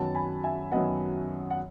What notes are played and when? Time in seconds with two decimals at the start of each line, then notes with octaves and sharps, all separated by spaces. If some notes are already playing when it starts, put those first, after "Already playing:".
Already playing: F#2 D#3 F#3 B3 F#5 A5
0.15 G#5 B5
0.44 E5 G#5
0.71 F#2 D#3 F#3 B3 D#5 F#5
1.50 F#5